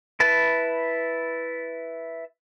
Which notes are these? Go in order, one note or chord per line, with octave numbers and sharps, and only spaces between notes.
E4 B4 A5